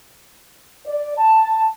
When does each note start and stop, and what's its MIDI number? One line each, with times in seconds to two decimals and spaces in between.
0.86 1.14 74
1.18 1.67 81